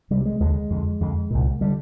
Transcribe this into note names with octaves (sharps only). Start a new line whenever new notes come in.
C2 C3 G3
G#3
D#2 D3 G#3
F2 D3
F2 D3
C2 A#2
D3 G3